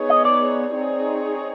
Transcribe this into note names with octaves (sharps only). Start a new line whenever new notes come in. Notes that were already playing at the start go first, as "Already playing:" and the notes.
Already playing: B3 D#4 G#4 C#5
D#5
D5
C4 D#4 G#4 C#5